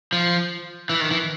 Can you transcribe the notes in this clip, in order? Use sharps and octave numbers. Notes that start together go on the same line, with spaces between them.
F3
E3
D#3
E3